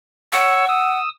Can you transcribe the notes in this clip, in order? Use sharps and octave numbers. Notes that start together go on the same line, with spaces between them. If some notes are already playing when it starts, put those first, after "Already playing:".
C#5 F#5 C#6 E6
D#6 E6